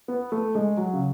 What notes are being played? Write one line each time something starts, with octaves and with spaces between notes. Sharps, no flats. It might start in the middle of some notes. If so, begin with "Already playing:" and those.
B3
A3
G#3
F#3
C#3